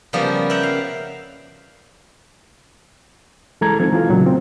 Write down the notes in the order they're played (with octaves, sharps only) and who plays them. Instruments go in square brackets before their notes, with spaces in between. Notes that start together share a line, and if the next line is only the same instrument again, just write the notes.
[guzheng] C#3 F3 G3 A#3 B3
E5 F#5 G5 A#5
F5
[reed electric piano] E3 G#3 A4 A#5 G#6
F3 C4 D#4
E3 F4 F5
A#2 C#3 F#3 A3
C4